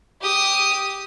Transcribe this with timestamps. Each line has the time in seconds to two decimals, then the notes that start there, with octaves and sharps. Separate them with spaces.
0.22 G4 D#6